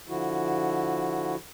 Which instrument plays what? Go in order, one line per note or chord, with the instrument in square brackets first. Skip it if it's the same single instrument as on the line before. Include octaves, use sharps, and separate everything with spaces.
[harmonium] D3 F3 E4 F#4